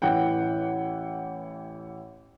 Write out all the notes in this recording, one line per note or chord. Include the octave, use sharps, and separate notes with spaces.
A1 E3 F#5 G5